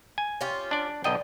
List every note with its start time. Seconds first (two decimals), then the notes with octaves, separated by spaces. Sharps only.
0.18 G#5
0.41 C#4 F4 G4
0.71 D4 D5
1.04 B1 D3 D#5 G5